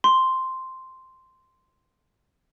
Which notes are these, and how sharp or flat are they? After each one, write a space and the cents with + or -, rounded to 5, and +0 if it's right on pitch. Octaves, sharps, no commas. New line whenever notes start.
C6 -5